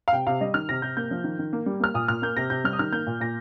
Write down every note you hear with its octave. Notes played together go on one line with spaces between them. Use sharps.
F5
C3 G5
C3 F5
G3 D#5
D#3 F6
C3 A#6
C3 G6
A#3 G6
F3
D#3
D#3
A#3
G3
A#3 F6
A#2 D#6
A#2 F6
A#3 G6
C3 A#6
C3 G6
G3 F6
D#6
D#3 F6
A#3 G6
A#2
A#2 A#6